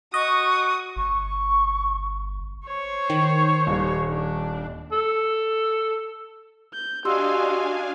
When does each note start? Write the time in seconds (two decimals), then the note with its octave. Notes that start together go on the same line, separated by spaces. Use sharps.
0.14 F#4 D#5 C#6 D#6
0.96 G1 C#6
2.68 C5 C#5
3.10 D#3
3.67 D#1 G3
4.10 D4
4.92 A4
6.74 G6
7.05 D4 F#4 G4 D#5 F5 G#5 C6 E6